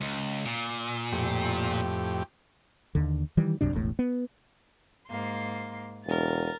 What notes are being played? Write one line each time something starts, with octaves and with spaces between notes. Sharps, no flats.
C#2
A#2
F2 A2 G4
D#2 D3
D#3 E3 G3
B1 F#2 C3 D4
E1 A1 A2
B3
G#2 A#3 C6
E1 A#4 A6